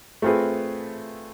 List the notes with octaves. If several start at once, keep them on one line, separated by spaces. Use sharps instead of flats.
A3 C4 F4 G#4 B4